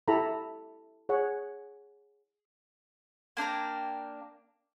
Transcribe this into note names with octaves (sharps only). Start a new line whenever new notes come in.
E4 G4 A4 A#5 B5
G#4 C#5 F#5
A#3 D4 G5 A#5